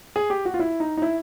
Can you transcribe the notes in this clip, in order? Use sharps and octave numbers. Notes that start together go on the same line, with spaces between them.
G#4
G4
F#4
F4
E4
D#4
D#4
E4